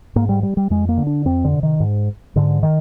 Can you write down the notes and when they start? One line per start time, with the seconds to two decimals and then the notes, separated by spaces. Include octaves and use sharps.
0.16 G#2 A#3
0.29 G3
0.43 G3
0.57 G3
0.70 F2 G#3
0.89 A#3
0.98 D3
1.07 D4
1.25 F2 C4
1.44 D3
1.53 C3
1.63 D#3
1.80 G#2
2.36 G#2 D3
2.63 D#3